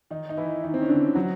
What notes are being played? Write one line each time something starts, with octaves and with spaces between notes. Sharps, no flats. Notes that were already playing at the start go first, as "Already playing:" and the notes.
D#3 D#4
D#4
E3 E4
D#3 D#4
C4
C#4
D3 D4
F#3 F#4